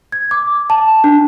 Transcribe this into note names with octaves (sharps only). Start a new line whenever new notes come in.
G#6
D6
A5
D4